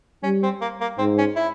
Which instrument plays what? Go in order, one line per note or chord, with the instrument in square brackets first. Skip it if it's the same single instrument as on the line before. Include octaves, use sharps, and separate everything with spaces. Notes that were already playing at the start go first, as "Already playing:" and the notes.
[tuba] G3 [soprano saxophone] C#4
[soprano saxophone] C4
A#3
A#3
[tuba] G#2 [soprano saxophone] C4
[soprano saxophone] C#4
E4